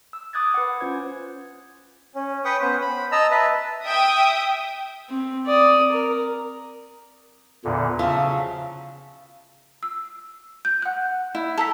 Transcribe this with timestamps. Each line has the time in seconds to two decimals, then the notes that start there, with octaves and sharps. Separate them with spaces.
0.13 E6
0.33 D6 D#6 F#6 G#6 A6
0.54 B4 F#5
0.80 C#4 F4 C5 G#6
2.15 C#4
2.45 B4 G5 C#6 D#6
2.61 B3 C#4 C5
2.81 B5
3.12 D#5 A5 A#5 E6
3.31 B4 E5 A5
3.86 E5 G5 D#6
5.09 C4
5.46 D5 D#6
5.92 A#4
7.65 E2 A#2 D3
7.99 C#3 F3 F#3 E5
9.83 E6
10.65 G6
10.82 F#5 F#6
11.35 E4
11.58 A4 A#5 E6 B6